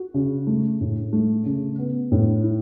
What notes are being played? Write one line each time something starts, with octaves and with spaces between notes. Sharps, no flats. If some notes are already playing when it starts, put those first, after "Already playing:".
Already playing: F#4
C#3
A3
A2
A3
C#3
B3
A2
E4